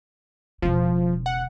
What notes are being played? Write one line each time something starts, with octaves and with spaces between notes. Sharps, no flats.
E1 C#3 F3
F#5